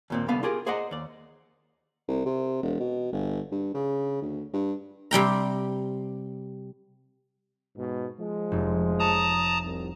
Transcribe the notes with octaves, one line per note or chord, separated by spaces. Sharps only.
D#2 A#2 C4
C2 D3 B3 F5 B5
F4 G4 G#4 A#4
G#4 C5 D5 D#5 F#5 A#5
D#2 D5
C2
C3
E1
B2
G1
G2
C#3
D2
G2
C3 G3 G5 A#5
G#2 B2
F3 G#3
F1
C#5 A5 A#5 D#6
C2